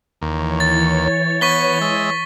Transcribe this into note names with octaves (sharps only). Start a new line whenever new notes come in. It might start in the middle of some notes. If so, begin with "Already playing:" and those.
D#2 E3 C#5
A6
B3 C#6 B6 G7
G#3 E5